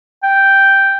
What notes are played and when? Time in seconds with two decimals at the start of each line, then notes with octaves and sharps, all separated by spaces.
0.23 G5